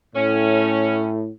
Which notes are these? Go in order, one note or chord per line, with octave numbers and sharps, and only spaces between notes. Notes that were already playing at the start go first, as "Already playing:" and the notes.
A2 C#4